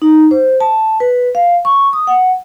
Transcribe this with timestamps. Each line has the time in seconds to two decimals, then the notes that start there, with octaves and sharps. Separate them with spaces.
0.02 D#4
0.31 C5
0.61 A5
1.00 B4
1.35 F5
1.65 C#6
1.93 D#6
2.07 F#5